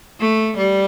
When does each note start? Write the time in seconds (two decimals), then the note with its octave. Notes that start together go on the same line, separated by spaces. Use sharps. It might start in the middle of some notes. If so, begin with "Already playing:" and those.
0.20 A3
0.57 G3